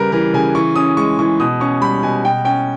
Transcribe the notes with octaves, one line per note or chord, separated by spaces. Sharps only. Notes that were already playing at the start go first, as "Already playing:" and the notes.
Already playing: C#3 G3 A#4 B4
E3 A#4
C#3 G#5
E3 C#6
C#4 D#6
G#3 C#6
E3 C#6
B2 D#6
C#4 C#6
G3 B5
B2 G#5
B2 G5
C#4 G5